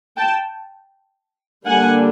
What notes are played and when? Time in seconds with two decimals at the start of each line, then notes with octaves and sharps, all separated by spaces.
0.17 G5 A5
1.66 D3 G3 A#3 D4 F#5 G#5